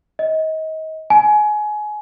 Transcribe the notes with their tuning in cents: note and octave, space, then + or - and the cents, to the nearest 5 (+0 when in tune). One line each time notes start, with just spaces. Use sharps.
D#5 +30
G#5 +25